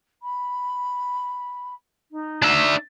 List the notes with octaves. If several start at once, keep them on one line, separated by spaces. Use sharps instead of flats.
B5
D#4
D4 E5